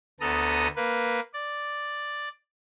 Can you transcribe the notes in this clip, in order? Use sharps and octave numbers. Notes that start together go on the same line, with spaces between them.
D2 B3 A4 A#5 D#6
A#3 B4
D5